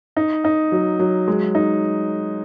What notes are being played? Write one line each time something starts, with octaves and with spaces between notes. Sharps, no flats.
D#4
D#4
F#3
F#3
G#3
D#4